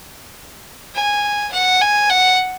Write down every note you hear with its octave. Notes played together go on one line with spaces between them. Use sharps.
G#5
F#5
G#5
F#5